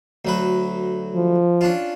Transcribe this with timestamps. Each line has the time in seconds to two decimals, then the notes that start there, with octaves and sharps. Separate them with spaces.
0.25 D2 F#3 B4
1.15 F3
1.61 C#4 D4 F4